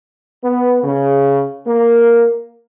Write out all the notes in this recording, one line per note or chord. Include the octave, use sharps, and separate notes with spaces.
B3
C#3
A#3